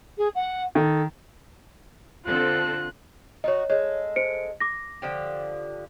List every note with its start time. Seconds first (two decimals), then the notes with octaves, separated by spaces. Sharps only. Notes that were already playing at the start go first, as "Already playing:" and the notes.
0.17 G#4
0.34 F#5
0.75 D#3 A4
2.26 D3 C4 F4 A4 F#6
3.44 D#4 F4 F#4 C#5 D#5
3.70 G#3 A4 C#5
4.16 C5 C#7 D7
4.60 D6 A#6
5.02 D3 F3 G4